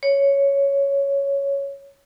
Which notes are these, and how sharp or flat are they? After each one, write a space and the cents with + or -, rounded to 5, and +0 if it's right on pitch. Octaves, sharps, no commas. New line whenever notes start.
C#5 +5